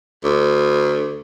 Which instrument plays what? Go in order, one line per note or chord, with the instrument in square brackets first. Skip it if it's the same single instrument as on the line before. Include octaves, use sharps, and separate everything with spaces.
[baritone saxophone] D2